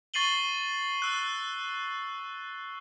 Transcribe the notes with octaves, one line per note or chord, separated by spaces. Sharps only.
C#6 A6 C7 D#7 F#7 G7
E6 F#6